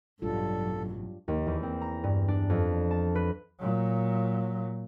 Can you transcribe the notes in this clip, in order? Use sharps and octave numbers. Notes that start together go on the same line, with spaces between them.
A1 G2 B2 F#3 G3 D4 F4 A4
D#2
E2
C4
A#5
G2
D4
F2
A5
B4
A#2 F#3